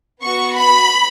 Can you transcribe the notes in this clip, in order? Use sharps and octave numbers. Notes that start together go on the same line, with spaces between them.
B3 F#4 C#6
B5